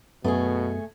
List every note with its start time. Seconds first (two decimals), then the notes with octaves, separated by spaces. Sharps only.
0.24 F#2 B2 A3 B3 C#4 G#4